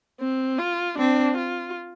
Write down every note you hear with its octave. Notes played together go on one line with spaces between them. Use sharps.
C4
F4
C4 D4
F4